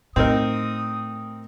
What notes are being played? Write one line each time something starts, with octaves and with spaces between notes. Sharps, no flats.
A2 C4 D#4 A#4 D#6